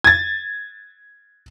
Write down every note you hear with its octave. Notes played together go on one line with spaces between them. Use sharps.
G#6 A6